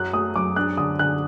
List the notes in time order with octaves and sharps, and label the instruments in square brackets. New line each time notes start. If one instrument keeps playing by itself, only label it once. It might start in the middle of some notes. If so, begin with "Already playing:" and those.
Already playing: [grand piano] F#2 F#3 [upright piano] F#6
[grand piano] A3 [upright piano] D#6
[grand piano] F#2 [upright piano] D6
[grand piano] D4 [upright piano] F#6
[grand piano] D3 [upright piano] D#6
[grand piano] D3 [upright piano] F#6